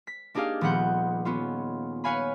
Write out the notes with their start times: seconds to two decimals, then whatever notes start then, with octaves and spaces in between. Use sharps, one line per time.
0.07 B6
0.34 A#3 D4 D#4 G4 G#4 F5
0.61 D#1 F3 B3 F#5 G6
1.25 B3 C#4 F4
2.04 B4 C#5 F5 G#5 B5